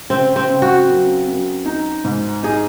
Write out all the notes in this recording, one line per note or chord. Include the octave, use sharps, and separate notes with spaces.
C#3 C4
C4
C#3
F#4
F#2
F#2
D#4
G#2
D#4 G#4